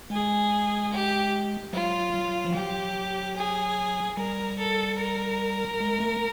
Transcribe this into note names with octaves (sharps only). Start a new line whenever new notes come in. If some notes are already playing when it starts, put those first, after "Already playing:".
G#3 G#4
G4
F#3 F4
F#3
F3
F#3 G4
G#4
G3 A#4
A4
A#4
G#3
A3